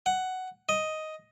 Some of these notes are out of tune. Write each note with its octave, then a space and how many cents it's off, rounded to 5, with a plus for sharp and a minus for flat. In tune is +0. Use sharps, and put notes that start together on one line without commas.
F#5 +10
D#5 +5